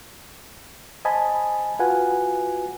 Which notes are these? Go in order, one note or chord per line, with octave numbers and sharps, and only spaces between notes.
C5 D#5 G#5 A5 B5
F4 F#4 B4 F#5 G#5